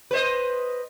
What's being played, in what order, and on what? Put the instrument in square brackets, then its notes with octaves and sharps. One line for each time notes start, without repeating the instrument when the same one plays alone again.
[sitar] B4 C5 D#5